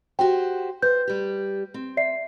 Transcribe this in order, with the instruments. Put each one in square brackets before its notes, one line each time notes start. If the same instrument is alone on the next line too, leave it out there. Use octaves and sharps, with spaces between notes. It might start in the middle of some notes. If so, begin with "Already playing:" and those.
[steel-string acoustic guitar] F#4 G4 C5 [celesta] G5
[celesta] B4 G6 [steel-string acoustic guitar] C5
[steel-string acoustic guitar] G3 G4
C4
[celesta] D5 E5 C7